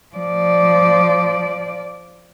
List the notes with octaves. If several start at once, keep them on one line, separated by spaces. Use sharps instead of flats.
F3 D5